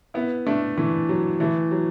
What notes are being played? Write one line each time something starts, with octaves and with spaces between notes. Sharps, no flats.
B3 E4
A3 D4
E3 A3
F#3
E3 A3
F#3